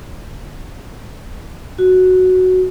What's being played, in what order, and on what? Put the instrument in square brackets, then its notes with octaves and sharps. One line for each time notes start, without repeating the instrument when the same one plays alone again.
[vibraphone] F#4